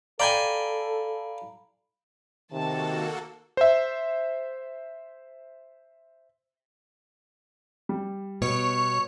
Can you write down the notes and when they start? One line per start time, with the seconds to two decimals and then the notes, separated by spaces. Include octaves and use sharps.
0.20 A4 D5 F5 G5 G#5 A#5 B5
2.52 C3 D#3 A#3 F#4 A4 A5
3.57 C5 E5
7.89 G3
8.42 B2 C#5